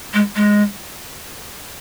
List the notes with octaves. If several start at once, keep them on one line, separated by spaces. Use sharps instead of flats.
G#3
G#3